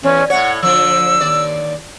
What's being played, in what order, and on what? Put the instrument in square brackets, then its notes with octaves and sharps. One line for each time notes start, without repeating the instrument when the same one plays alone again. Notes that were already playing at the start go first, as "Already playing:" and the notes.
[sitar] E2 [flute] C#4
[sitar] A2 C#5 [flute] F#5
[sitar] D3 F3 [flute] E6
[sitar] D#2 D5